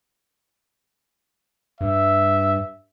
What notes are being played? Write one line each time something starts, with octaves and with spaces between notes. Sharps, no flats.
G2 E5